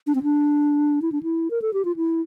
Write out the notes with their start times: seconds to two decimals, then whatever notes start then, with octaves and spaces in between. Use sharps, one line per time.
0.07 D4
0.15 C4
0.23 D4
1.02 E4
1.12 D4
1.23 E4
1.51 A#4
1.62 A4
1.74 G4
1.85 F4
1.96 E4